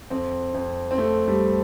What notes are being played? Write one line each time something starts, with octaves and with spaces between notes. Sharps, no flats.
F2 C4
F2
C4
F2 A3
G3